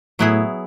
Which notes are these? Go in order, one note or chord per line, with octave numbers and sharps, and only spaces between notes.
A2 F#3 B3 E4 G#4